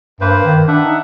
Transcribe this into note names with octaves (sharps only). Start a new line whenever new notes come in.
G2 A#3 B4 C5
D#3
D4 E5 F#5
D#4